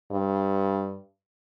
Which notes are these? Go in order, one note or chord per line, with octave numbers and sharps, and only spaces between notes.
G2